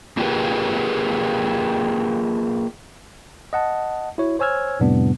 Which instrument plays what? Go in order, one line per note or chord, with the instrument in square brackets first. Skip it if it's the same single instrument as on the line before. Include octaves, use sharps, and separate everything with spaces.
[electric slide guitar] A#3 F4 G4 G#4 A#4 B4
[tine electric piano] D#5 F#5 A5
E4 F#4 C#5
C5 C#5 G#5 E6 F6 G#6
F2 A2 C3 G3 B3 D4